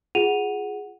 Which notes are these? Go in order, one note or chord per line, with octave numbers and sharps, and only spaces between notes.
F4 G#4 F#5 D#7 F7